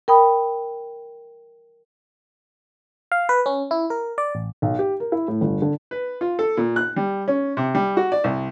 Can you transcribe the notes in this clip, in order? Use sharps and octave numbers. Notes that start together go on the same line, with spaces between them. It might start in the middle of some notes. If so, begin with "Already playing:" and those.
A#4 G5 B5 D#6
F5
B4
C#4
E4
A#4
D5
A1
B1
G4
A#4
E4
A2
G1
D3
B4
F4
A4
A#2
F#6
G3
C#4
C3
G3
F#4
D5
C2